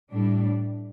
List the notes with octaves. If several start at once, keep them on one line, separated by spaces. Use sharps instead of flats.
A2 G3 D4